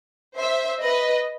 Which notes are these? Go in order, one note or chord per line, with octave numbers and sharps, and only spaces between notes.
C5 E5
B4 D#5